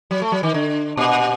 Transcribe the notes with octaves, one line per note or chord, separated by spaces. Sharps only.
F#3
A3
F#3
D#3
D3
A#2